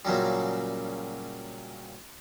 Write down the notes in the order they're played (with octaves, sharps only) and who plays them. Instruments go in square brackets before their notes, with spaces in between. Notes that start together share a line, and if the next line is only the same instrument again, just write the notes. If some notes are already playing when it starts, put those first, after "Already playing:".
[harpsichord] A#2 C#3 F#3 G3